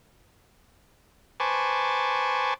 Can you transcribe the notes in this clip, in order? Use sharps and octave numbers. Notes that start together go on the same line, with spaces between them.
B4 C5 G#5 A5 C#6 D6